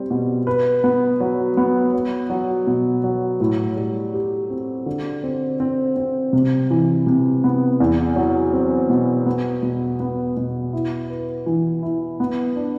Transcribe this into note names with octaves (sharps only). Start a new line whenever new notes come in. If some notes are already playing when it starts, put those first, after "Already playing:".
Already playing: G3 C4
B2
B4
B3
F#3
B3
F#3
F#3
B2
F#3
A2
G3
G4
C4
D3
C4
C4
C4
C3
E3
C3
B3
E2
F#3
C4
B2
B3
B2
B3
B2
E4
B4
E3
E4
B3
D4